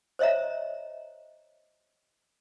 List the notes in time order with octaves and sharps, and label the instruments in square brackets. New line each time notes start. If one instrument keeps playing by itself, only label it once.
[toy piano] C5 C#5 D#5 E5 A#5